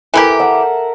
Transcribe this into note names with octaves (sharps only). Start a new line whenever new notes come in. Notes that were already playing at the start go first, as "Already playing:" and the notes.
E3 E4 G4 A4 A#4
E5 F#5